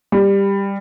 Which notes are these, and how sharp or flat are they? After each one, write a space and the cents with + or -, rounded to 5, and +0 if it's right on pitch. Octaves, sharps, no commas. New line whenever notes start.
G3 +15